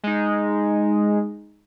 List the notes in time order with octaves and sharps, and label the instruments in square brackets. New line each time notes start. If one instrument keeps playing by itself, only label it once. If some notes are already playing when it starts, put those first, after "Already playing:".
[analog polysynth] G#3 D#4